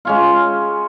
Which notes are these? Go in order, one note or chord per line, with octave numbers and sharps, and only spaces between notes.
G#3 C#4 F4